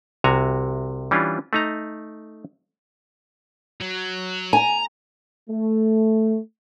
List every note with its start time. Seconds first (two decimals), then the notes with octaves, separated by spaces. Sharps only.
0.24 C2 C3 F#4 G#5 A#5
1.11 E3 G3 C#4 D4 F4
1.53 A3 D#4 A#5
3.81 F#3
4.53 G#5 A#5
5.49 A3